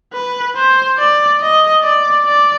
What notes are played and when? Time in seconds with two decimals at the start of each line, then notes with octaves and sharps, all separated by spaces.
0.13 B4
0.56 C5
0.98 D5
1.41 D#5
1.83 D5
2.26 D5